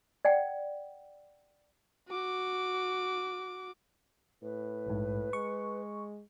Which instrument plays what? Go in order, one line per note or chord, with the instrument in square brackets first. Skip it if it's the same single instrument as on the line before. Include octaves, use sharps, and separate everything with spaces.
[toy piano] D5 F#5 G5
[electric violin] F#4 D6
[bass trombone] A2 [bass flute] B4
[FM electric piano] A#1 G#2
[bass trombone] G#3 [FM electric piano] C#6